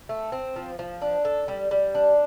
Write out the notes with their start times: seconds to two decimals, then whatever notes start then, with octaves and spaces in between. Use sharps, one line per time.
0.09 A3
0.32 C4
0.56 F3
0.79 F3
1.02 D4
1.25 A4
1.48 G3
1.71 G3
1.95 D4